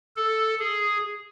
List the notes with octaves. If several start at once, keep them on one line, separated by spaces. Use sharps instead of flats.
A4
G#4